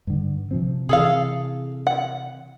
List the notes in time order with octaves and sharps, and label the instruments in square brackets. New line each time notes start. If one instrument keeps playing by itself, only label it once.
[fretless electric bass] G2 D3
C3 F3 C4
[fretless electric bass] C3 E3 [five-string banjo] G#4 A4 F5
[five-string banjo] F#5